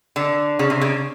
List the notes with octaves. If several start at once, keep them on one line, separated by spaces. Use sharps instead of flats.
D3
C#3
C3
C#3